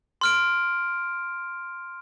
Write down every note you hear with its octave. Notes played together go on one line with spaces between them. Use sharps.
C6 F6 D7